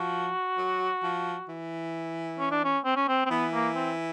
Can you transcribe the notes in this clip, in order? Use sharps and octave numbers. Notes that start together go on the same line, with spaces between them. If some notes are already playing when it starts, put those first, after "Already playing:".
Already playing: F3 F#4
F#3
F3
E3
C#4
D4
C#4
C4
C#4
C4
C4
E3 B3
A#3
C4